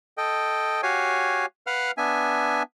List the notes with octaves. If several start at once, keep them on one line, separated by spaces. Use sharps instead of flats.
A4 D#5 G5
F#4 G4 C#5 F5 G#5
B4 F5 F#5 F6
B3 D4 E5 G#5